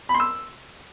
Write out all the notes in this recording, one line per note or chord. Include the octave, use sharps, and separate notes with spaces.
B5
C6
E6